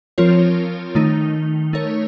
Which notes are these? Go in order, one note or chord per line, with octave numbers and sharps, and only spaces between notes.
F3 C4 F4 A#4 C#5
D#3 A3 D#4
A3 D#4 A#4 C#5